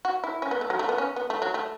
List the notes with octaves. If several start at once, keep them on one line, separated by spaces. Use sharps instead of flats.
F#4
E4
C#4
B3
A3
F#3
A3
B3
C#4
B3
A3
F#3
A3